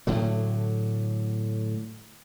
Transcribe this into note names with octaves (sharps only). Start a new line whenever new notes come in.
A2 D3 F#3